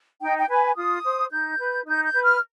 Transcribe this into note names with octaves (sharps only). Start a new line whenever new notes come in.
D#4 G5
G5
B4 G#5
F4 D#6
C5
D#4 G6
B4
D#4 G6
G6
B4
F6